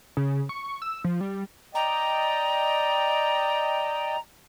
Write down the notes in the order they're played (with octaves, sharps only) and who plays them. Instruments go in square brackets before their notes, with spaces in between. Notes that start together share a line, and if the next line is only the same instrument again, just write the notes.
[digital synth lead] C#3
C#6
E6
F3
G3
[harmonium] D5 D#5 G5 [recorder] A#5